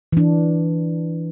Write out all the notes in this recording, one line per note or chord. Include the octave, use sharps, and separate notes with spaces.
E3 D4